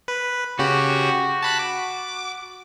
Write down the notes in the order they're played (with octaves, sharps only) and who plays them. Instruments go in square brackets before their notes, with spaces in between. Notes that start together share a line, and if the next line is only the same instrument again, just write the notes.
[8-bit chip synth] B4
[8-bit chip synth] C#3 G4 [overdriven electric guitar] F#4
[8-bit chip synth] A5 B5 F#6
D6